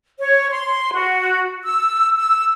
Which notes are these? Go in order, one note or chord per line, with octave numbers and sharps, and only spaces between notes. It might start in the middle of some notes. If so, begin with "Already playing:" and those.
C#5
C6
F#4
E6
E6